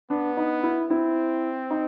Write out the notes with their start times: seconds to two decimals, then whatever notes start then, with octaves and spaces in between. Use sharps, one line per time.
0.10 B3 D4
0.37 D#4
0.63 E4
0.90 C4 E4
1.70 D#4